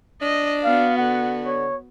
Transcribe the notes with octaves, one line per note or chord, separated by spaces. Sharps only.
D4 D#5
B3 F#4 F5
D3 F#5
C#5